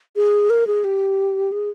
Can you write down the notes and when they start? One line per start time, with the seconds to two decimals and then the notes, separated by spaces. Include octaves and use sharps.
0.16 G#4
0.50 A#4
0.67 G#4
0.84 G4
1.52 G#4